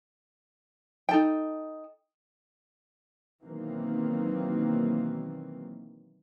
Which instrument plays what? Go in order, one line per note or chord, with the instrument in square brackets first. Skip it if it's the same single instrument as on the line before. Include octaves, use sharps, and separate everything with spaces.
[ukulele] D#4 A4 G5
[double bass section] B2 D#3 E3 F#3 A#3 C4